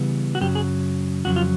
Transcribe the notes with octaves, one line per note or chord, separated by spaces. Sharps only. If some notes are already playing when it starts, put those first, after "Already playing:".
Already playing: C#3 E3 G3 B3
F#4
F#2 C#3 F#3 G4
G#4
F2 C#3 F#3 F#4
F4